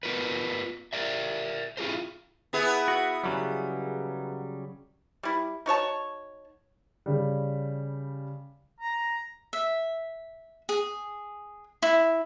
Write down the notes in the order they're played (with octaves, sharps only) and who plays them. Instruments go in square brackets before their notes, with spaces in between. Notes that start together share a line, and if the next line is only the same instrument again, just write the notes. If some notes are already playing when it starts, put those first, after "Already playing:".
[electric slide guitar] B3 F4 A#4 B4
A#4 D5 E5
E4 F4 G#4 A#4 C5
[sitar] B3 E4 G#4
[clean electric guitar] F#4
C#3 F#3 G3
[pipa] G3 E4
D#4 F#4 C#5 A5
[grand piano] C#3 G3
[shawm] A#5
[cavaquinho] E5
G#4
E4